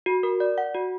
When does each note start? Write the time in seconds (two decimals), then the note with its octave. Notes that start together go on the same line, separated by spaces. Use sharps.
0.06 F#4
0.23 A#4
0.40 D5
0.58 F#5
0.74 F#4